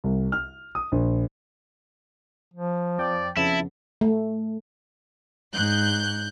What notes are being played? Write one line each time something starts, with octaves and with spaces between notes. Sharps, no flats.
C2
F6
D#6
A#1
F3
F2 D5 G5
F2 C#3 B3 E4 A5
A3
G#2 F#6 G6